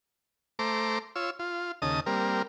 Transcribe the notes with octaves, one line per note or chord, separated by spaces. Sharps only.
A3 C5 A#5 D6
F4 C#5 E6
F4
D#2 C#3 D#5 A5 D#6
G3 A#3 C4 A#4